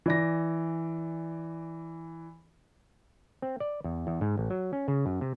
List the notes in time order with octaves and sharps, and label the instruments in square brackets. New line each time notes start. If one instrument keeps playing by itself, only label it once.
[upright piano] E3 D5 A#6
[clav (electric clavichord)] C4
D5
E2
E2
G#2
A1
F#3
C#4
C#3
F#2
C3